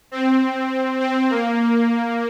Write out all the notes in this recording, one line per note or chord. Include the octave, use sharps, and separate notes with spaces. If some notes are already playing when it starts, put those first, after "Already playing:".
C4
C4
A#3